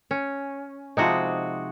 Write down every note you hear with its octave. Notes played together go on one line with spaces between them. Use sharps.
C#4
C3 F3 G#3 D#4 F#4